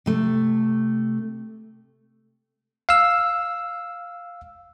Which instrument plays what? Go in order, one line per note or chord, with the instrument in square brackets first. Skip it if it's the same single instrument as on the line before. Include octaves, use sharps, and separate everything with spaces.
[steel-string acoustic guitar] C3 A3
[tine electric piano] F5 E6